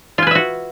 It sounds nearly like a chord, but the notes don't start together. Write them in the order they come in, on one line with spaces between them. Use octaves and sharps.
F4 G#5 B4 E5 F#4